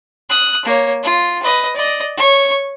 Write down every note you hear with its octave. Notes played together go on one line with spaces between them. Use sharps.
D#6 F#6
A#3 C#5
F4
B4 D#5
D5 D#5
C#5 C#6